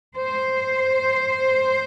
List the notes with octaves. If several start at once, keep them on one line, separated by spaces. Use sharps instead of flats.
C5